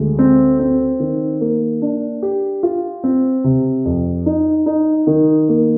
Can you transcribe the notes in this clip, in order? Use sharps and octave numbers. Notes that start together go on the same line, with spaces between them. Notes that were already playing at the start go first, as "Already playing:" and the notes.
Already playing: D2 G#3
C4
C4
D#3
A#3
D4
G4
F4
C4
C3
F2
D#4
D#4
D#3
A#3